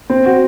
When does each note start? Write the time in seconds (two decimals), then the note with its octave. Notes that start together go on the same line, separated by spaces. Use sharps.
0.10 C4
0.26 F#4